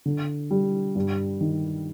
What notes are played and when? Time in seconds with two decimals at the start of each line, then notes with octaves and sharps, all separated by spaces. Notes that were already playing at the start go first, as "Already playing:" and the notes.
0.06 D3
0.51 G3
0.95 G2
1.41 D#3